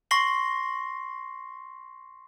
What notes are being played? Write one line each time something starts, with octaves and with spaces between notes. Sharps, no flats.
C6 C#6 A#6 C7 F#7 G7